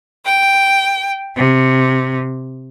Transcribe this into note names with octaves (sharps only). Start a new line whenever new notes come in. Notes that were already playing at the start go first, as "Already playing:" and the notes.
G5
C3